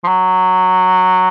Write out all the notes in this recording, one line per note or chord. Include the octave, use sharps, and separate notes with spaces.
F3
F#3